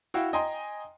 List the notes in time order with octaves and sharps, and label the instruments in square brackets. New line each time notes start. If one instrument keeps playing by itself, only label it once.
[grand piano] E4 F#4 F5 G5
D#5 G5 G#5 A#5 C6